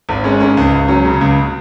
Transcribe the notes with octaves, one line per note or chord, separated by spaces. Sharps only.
G#1
G#3 C#4
G#2 C#4
C#2
C#2
F#3 C#4
C#3
C#2